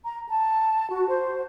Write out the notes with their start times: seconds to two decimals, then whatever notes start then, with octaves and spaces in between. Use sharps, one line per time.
0.05 A#5
0.29 A5
0.90 F#4
1.08 C5